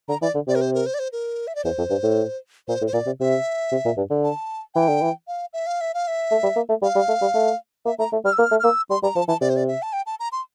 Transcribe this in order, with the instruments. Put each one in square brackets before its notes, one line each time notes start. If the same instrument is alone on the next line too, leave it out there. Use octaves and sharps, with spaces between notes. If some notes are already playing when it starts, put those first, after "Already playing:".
[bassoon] D3 [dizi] A#5
[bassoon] E3 [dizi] D5
[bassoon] D3
[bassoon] C3 [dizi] D5
[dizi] A#4
C5
A#4
C5
D5
C5
A#4
E5
D5
[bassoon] E2 [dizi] C5
[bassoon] F2
G2
A2
[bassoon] A#2 [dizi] C5
[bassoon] A2
[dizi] C5
[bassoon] A#2 [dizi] D5
[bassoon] C3
[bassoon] C3 [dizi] E5
[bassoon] C3
A#2
G2
D3
[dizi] A5
[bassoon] E3 [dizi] G5
[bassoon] D3
E3
[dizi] F5
E5
F5
E5
F5
E5
[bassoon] A3
G3
A#3
A3
[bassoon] G3 [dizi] F5
[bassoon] G3
A3
G3
A3
[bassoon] A#3 [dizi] E5
[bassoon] A3 [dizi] A#5
[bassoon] A3
[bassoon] G3 [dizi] F6
[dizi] E6
[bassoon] A#3 [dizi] F6
[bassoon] A3
[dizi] F6
[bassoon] A#3 [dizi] E6
[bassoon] G3 [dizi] C6
[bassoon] G3 [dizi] A#5
[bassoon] F3 [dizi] A5
[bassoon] E3 [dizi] A5
[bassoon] C3 [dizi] D5
[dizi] C5
D5
E5
A5
G5
A5
A#5
C6